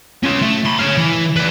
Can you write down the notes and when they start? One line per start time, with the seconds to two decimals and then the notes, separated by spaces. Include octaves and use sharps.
0.24 C#4 F4
0.42 A3
0.66 B5 C6
0.79 C#5 F5
0.98 E3
1.37 B4 D5